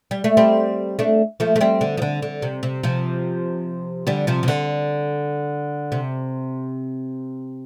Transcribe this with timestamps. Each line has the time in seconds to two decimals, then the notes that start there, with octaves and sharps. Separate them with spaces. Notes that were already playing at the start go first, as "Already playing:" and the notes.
0.11 G3
0.24 A3
0.37 G3 C4
0.99 A3 D4
1.40 F3 A3
1.56 A3
1.61 G3 C4
1.81 D3
1.97 F3
2.02 D3
2.22 D3
2.42 C3
2.63 C3
2.83 C3 F3
4.07 D3 G3
4.27 C3 F3
4.43 C3
4.48 D3
5.92 C3